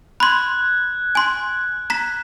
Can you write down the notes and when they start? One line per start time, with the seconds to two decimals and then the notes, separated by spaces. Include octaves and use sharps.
0.20 B5 C6 F#6 G#6
1.15 G#5 C6
1.90 A#5 B6